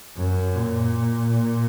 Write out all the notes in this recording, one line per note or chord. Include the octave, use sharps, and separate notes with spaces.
F#2
A#2
A#2